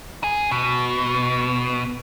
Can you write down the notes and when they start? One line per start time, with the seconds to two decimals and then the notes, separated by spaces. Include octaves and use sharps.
0.24 G#4
0.51 B2